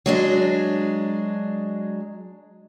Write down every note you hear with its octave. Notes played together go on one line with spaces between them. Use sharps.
F#3 G#3 D4